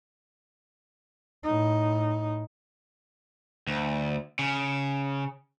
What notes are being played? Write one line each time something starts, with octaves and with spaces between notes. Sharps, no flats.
A2 D#4
D2
C#3